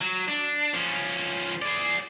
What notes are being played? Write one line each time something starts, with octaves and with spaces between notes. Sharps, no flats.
F#3
D4
F3 C#4
G#4 D5